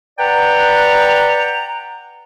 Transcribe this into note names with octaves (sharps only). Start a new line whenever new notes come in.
B4 D5 F#5 G5 A#5